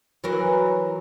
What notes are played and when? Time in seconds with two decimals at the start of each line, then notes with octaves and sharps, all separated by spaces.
0.24 E3 F#3 A#4